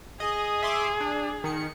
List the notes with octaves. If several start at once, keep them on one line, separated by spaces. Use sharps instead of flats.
G#4 D#5
E5 C6 D6
D4
D#3 C#7